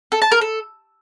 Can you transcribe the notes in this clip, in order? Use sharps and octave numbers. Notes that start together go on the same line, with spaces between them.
A4
A5
A#4
A4